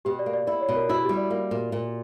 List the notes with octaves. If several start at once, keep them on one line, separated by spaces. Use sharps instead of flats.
B2 G4
D5
A#3
D5
E4 D5
C#5
B2
A#4
E4 F#4
G4
G3
D5
A#3 D5
A#2
A#2